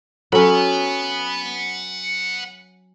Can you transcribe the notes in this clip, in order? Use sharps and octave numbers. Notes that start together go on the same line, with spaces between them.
F#3 C#4 A4 F#5 B5